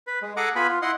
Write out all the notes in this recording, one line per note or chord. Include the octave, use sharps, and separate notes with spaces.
B4
G#3
G#4 A4 F#5 G#5 A#5 D6
B3 F4 B4 G#5 B5
F4
E4 D#5 F#5 C6